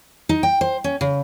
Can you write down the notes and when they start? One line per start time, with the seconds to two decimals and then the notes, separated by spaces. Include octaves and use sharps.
0.29 D#4
0.43 G5
0.61 C5
0.84 C#4
1.01 C#3